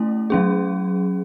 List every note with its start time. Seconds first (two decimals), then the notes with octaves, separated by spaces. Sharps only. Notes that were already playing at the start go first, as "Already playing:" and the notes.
Already playing: A3 C#4 E4
0.30 F#3 C#4 G#4